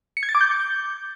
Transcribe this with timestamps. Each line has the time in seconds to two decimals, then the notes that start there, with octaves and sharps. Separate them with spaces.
0.17 C#7
0.23 G#6
0.29 A6
0.35 D6
0.41 G6